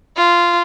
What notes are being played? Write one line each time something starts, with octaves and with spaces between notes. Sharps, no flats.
F4